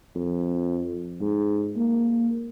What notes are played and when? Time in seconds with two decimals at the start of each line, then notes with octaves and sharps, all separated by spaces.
0.15 F2
1.21 G#2
1.76 A#3